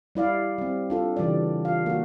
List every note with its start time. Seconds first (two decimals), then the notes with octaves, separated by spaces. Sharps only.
0.15 G3 E4 D5 F5
0.58 G3 C4
0.90 D4 F4 A4
1.17 C#3 E3 G3 D4 D5
1.65 F4 F5
1.86 A#3 F#4